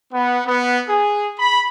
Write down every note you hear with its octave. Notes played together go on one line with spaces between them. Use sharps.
B3
B3
G#4
B5